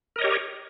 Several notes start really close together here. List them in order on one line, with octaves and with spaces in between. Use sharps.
A#4 D#5 C#5 G4